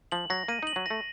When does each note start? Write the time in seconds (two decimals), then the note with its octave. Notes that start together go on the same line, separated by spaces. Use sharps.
0.12 F3 F#7
0.30 F#3 A#6
0.48 A#3 D#7
0.63 D#4 F#7
0.76 F#3
0.86 A3 A#6